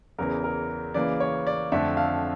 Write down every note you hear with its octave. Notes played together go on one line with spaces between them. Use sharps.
E2 C#3 E3 A#4
A#4
C#3 E3 A#3 D5
C#5
D5
F2 D3 A3 E5
F5